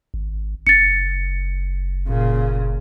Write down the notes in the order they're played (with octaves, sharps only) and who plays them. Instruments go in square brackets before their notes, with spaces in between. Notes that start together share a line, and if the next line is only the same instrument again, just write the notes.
[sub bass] G#1
[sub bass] F#1 [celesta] A6 C#7
[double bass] A#2 C#3